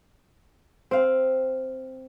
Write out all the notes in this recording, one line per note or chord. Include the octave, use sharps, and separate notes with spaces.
C4 F5